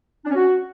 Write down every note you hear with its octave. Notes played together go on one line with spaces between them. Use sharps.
D4
C#4
F#4